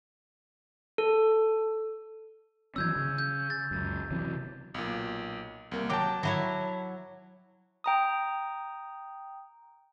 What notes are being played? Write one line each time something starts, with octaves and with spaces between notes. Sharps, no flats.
A4
E3 F#3 C#4 E6 G6 G#6
C#3
G6
A6
C#2 F#2
C3 E3 F#3
B1 A#2
C2 A#3
F#3 G5 A5 D6
F#3 E4 C#5
G5 A#5 D#6